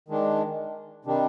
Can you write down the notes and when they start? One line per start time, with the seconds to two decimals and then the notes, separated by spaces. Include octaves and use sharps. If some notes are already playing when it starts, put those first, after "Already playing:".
0.08 D#3 G#3 D4
1.05 C3 D#3 G3 D4